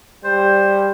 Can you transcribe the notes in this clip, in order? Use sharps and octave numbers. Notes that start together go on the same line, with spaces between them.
G3 C5